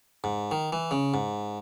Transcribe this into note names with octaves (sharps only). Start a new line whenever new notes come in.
G#2
D#3
E3
C#3
G#2